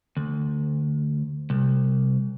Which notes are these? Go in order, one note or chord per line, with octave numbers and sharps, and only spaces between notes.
D2
C2